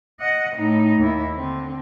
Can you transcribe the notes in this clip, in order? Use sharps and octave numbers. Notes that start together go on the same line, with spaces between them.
D#5 F#5
A2 D#4
D#2 E4
D3 C4